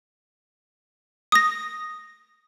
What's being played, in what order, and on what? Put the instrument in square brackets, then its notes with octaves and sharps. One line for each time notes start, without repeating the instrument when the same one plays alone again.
[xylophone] D#6 A#6